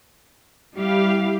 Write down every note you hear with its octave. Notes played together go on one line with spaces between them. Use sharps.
G3 E4 G4 F5